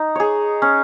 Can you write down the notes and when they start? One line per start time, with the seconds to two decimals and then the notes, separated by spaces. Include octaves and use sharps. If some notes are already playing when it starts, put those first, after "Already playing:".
Already playing: D#4
0.15 G#4 C#5
0.62 C#4